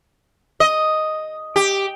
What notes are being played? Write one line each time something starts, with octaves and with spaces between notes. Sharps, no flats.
D#5
G4